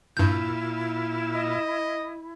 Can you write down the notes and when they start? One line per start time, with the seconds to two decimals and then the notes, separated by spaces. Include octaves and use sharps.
0.17 G2 A#2 E4 F4 E6 G6
1.35 D#5